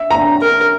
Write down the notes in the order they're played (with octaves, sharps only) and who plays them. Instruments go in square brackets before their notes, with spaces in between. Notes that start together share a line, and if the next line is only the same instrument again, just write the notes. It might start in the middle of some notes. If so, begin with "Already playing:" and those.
Already playing: [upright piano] E5
A#5
[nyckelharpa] A#4